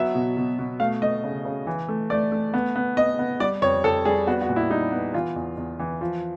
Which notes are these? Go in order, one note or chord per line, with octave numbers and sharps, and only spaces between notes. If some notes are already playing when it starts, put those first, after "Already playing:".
Already playing: F#3 B3 E5
B2
B2
B2
A3 F5
A3 D#5
C#3
C#3
E3
A3
A3 D5
A3
B3
B3
B3 D#5
B3
G3 D5
F2 C#5
F2 A4
G3 G#4
B3 F#4
F#4
A#2
E4
G3 D#4
B3
E3 F4
E2
E2
E3
F3